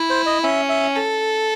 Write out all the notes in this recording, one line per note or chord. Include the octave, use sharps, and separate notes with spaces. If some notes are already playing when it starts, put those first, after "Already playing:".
Already playing: E4
C5
D#5
C#4 E5
E5
A4